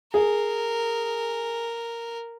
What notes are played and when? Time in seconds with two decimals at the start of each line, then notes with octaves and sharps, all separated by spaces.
0.14 G#4 A#4